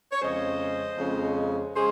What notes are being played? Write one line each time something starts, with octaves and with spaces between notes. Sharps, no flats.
C#5
F2 C#3 G#3 C#4 C5 D#5
F2 C#3 G#3 C#4
C#3 G#3 C#4 G#4 C5